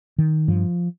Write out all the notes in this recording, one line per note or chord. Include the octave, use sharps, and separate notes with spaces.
D#3
G2 F3